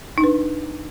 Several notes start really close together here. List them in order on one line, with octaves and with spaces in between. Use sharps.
D#4 D4 B4